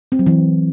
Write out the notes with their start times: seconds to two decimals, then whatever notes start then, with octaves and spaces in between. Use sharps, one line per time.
0.12 C4
0.19 F#3
0.27 E3